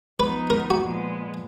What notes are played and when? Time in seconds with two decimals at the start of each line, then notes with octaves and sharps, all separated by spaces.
0.20 F3 B3 D#4 B4
0.50 A#4
0.70 F#4
0.80 A#2 F3 G#3 B3